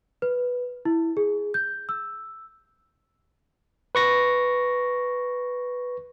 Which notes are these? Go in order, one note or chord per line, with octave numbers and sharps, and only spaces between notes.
B4
E4
G#4
G6
E6
B4 C#6 A#6